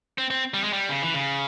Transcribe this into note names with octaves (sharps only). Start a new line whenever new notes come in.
C4
C4
G3
G#3
G3
C#3
E3
C#3